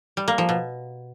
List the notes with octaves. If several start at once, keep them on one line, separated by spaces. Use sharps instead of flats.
G3
A#3
F3
B2